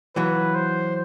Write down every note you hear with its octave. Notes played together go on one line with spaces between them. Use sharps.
E3 F#3 B4
C5